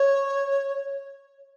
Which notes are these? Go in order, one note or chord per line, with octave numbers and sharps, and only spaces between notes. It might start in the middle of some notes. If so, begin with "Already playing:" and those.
Already playing: C#5